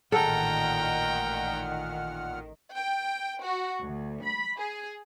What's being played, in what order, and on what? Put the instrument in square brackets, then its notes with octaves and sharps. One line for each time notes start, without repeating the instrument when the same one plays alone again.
[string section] A1 D#3 [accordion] A#2 F#5 F6 [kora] A4 [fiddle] G5 A#5
[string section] G5
F#4
D2
B5
G#4